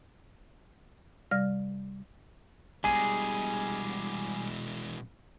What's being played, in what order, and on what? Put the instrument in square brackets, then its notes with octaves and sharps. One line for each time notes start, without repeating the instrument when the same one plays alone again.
[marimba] C3 G3 D5 F6 A#6
[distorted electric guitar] B2 G#3 [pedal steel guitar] G3 G#4 [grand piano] G#5